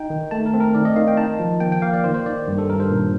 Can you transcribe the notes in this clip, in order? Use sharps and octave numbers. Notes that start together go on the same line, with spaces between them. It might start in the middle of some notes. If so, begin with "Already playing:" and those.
Already playing: D#4 G5
D#3
A3 A5
A#4
C4
A#4
D#3 D5
D#5
D#3 F5
G5
D#4 A5
F3
A#3 G5
G5
A#3 F5
D5
D#3 C5
C5
D#3 D5
G2
A4
G2 A#4
C5
A#2